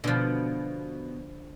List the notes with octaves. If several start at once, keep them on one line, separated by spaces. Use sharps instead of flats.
B2 D3 F3